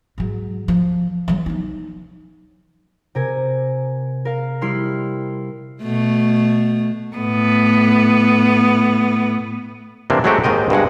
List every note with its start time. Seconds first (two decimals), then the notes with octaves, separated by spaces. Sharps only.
0.18 G#2 F#3
0.68 F3
1.28 E3 F#3
1.46 F3 D#4
3.15 C3 A#4 G#5
4.25 A#4 F5
4.61 G3 E4 C6 F6
5.82 B2 A3
7.16 A2 B3
10.10 C3 E3 A#3 D4
10.24 F#3 G#3 A3 C4 F#4 G4
10.44 D#2 G#2 D#3 D#5 G5
10.70 G2 B2 G#3 F#5